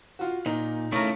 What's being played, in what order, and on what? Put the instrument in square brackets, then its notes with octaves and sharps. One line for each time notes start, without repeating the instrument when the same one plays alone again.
[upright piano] F4 F#4
[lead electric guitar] A#2 [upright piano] D#4
[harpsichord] C#3 A#4 [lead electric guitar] A3 E4